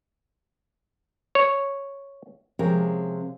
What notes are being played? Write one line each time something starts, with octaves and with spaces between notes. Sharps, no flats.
C#5
C3 F3 G#3 C4 C#4 A#4